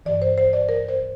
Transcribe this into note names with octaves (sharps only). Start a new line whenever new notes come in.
G2 E3 D5
C5
C5
D5
A#4
C5